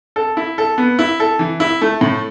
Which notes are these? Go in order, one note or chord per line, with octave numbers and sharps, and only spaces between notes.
A4
E4
A4
B3
E4
A4
E3
E4
A3
A2